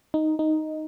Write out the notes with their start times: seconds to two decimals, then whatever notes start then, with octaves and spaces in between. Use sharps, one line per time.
0.14 D#4
0.39 D#4